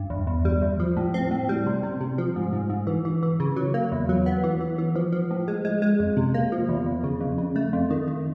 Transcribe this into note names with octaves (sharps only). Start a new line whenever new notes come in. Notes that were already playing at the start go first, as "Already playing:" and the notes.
Already playing: G2
E2
E2
G3
E2
F3
A2
C4
A2
G3
C3
C3
C3
F3
G#2
G#2
G#2
E3
E3
E3
C#3
F#3
A#3
E2
F#3
B3
E3
E3
E3
F3
F3
A2
G#3
G#3
G#3
F2
C3
A#3
F3
E2
E2
C#3
F2
C#3
A3
F2
D#3
D#3